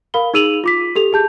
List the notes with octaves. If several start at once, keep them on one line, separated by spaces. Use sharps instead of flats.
A#4 F5 B5 G7
D#4 G#4 E6 D#7 F7 F#7
F4 D6 B6
G4 A4 F7
G#4 A5 G6